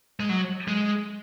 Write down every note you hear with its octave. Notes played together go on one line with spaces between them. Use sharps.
G#3
F#3
G#3